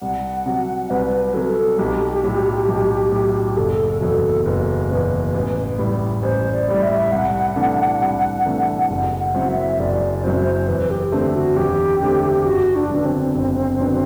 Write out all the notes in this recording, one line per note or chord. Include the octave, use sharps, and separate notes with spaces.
C2 F#5
C3 F#3
C2 B4
C3 F#3 A4
B4
A4
B1 G4
A2 F#3
B1
A2 F#3
F#1 A4
E2 B2 F#3 A4
F#1 B4
E2 B2 F#3
A1
A2 G3
A1 C5
D5
A2 G3
E5
C2 F#5
C3 E3 A3 D4
C2
C3 E3 A3 D4
F#1 F#5
F#5
F#2 F#3 C4 E4
E5
F#1 D5
F#2 F#3 C4 E4 C5
E2 B4
G4
D3 A3 C4
F#4
E2 G4
D3 A3 C4
F#1 F#4
D4
F#2 D3 F#3 B3
C4
F#1
F#2 D3 F#3 B3